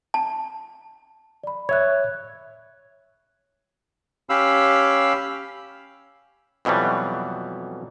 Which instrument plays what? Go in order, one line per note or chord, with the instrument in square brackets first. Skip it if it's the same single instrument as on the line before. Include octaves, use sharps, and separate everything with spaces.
[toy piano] A5
[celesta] D5 B5
[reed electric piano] C#5 E5 [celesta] F#6 G#6
[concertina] C#4 G4 F5 B5 E6
[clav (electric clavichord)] F2 B2 E3 F#3 G3